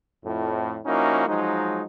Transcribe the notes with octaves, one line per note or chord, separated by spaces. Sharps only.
F2 A2
F3 A#3 C#4 D#4 E4 F#4
F3 F#3 G#3 D#4